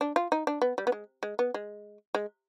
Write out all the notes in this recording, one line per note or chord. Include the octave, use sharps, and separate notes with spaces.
D4
F4
D#4
D4
B3
G3
B3
G#3
G#3
B3
G#3
G#3